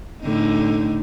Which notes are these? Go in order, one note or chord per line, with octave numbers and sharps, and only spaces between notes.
A2 D3 D#4